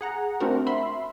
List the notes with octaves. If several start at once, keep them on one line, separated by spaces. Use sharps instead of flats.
G#4 F#5 A#5
A3 C4 D4 F#4 A#4
E5 B5 C6